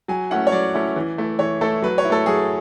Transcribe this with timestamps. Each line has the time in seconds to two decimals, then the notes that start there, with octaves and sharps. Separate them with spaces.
0.08 F#3 G#5
0.30 A3 C#4 E4 F#5
0.47 C#5
0.52 F#3 D5
0.74 A3 C#4 E4
0.96 E3
1.18 A3 E4
1.39 E3 C#5
1.61 A3 E4 A4
1.83 F#3 B4
1.98 C#5
2.05 E4
2.10 A3 A4
2.26 F#3 G#4